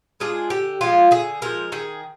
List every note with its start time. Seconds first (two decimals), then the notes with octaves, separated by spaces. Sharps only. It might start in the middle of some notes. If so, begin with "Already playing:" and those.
0.20 G#3 D4 F4 G#4
0.50 D3 G4
0.81 F3 G#3 F4
1.11 D3 G#4
1.42 F3 G#3 A#4
1.72 D#3 G#4